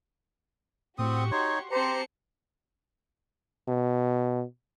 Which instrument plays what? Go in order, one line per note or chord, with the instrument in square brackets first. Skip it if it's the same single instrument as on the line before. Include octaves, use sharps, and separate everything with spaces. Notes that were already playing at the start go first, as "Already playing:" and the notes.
[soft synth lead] A2 [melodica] C4 D#6 [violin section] F#4 G4 C#6
[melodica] D#4 C#5 [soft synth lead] C6
[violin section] C4 A5 C#7 [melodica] G4 A#5 [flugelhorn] C5
[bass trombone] B2